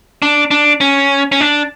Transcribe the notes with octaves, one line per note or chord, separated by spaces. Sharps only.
D4
D4
C#4
C#4
D4